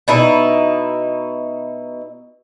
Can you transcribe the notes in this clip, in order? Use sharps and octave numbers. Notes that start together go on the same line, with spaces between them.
B2 D#4 E4